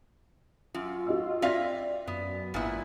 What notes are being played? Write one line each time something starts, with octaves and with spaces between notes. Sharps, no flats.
F#2 F4
F#4 D#5 E6
C4 D5 E5 F5 A#6
F#2 B3
G#1 A#2 B3 E4